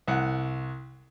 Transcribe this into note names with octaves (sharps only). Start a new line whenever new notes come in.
C2 F#5